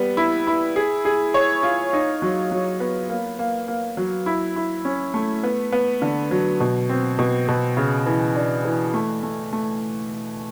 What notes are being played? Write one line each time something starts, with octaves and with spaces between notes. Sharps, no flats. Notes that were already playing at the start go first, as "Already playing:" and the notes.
Already playing: G3 B3
E4
E4
G#4
G#4
C#5
F4
D#4
F#3
F#3
B3
A#3
A#3
A#3
F#3
E4
E4
C#4
A3
B3
B3
D3
F#3
B2
C4
B2
B2
C#3
E3
D4
E3
A3
A3
A3